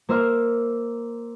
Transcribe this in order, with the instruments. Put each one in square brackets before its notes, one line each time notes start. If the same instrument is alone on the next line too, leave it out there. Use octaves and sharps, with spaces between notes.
[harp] A#3 C5 E5 F6